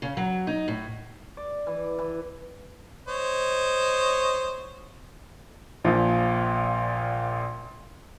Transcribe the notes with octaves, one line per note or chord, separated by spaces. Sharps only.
C#3
F#3
D#4
A2
D5
E3
E3
C5 C#5 D#5
A#1 A#2 F3